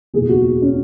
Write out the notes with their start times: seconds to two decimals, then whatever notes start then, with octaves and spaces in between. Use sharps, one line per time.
0.13 F#1 E2 B2 G#4
0.29 F#4
0.62 C#4